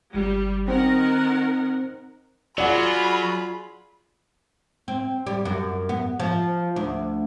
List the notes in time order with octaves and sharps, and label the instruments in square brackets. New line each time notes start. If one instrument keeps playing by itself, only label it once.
[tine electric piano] G1 [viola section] G3
[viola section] D#3 A#4 F#5 [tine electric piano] C4 C5
[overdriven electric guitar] F#3 [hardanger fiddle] F4 G#4 [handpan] D5 F#5 [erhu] B5
[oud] C4
G3
F#2
B3
F3
D2